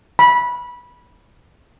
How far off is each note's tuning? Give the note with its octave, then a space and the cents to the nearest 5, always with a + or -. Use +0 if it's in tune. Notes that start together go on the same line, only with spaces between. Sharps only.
B5 -15